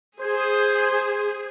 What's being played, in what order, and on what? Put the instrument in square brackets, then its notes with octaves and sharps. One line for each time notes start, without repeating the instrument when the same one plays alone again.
[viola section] G#4 [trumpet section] C5